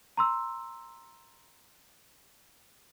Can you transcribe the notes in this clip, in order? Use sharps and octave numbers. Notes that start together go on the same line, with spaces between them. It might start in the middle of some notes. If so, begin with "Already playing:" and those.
A#5 C6 E6